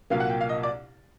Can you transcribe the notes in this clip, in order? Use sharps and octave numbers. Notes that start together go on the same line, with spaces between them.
C2 A#2 F#3 A#3 F5
F#5
G5
F5
D#5
D5